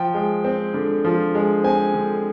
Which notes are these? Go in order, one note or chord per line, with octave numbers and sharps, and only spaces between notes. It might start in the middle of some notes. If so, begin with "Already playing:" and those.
Already playing: F3 G5
G#3
C4
D3
F3
G#3
C4 G#5
D3